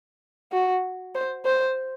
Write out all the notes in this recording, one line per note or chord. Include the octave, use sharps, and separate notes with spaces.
F#4
C5
C5